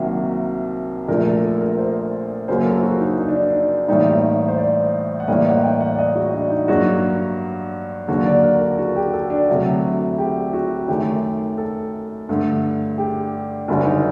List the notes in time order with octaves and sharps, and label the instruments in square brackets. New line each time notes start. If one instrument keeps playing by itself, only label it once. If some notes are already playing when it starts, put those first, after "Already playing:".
Already playing: [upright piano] C2 C3 D#3 F#3 A#3 A#4
A#1 A#2 A3 A#4
A4
A4
A#4
C5
F#1 F#2 F#3 A#3 C5
A4
F#4
D#4
D#4
D4
D4
A1 A2 G3 A#3 D#4
C5
D5
F#5
A1 A2 G3 A#3 D#5
F#5
G5
F#5
D5
D#5
F#4
D4
D#4
G2 F#3 A#3 F#4
D#2 D3 F#3 A#3 F#4
D5
A#4
A4
F#4
G4
A4
D4
D2 C3 F#3 A3
G4
F#4
F#2 D#3 A3 G4
A4
G2 D3 A3
G4
F#1 F#2 D3 G3 F#4
D#4